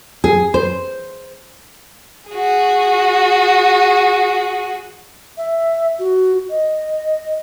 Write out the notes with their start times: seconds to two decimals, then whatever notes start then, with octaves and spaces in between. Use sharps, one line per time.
0.24 G#4
0.54 C5
2.31 F#4 G#4
5.37 E5
5.99 F#4
6.50 D#5